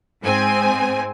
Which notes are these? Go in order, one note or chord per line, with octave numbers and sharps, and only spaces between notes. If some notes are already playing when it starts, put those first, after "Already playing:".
G#2 C4 G#5